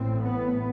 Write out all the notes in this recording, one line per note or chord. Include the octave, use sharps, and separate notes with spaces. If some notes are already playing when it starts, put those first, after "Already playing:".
Already playing: A1 A2 C4
B3